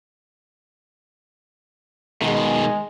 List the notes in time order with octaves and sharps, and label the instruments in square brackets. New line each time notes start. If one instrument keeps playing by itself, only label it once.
[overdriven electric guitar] B2 D#3 [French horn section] G#3